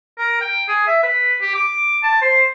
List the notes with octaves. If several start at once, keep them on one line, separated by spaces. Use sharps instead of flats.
A#4
G5
G#4
E5
B4
G4
D6
A5
C5